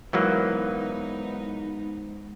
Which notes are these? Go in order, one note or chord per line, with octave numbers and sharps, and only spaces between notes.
G#2 E3 F#3 A#3 B3 D#4